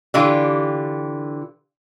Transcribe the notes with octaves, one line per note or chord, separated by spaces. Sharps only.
D3 E3 F4 G4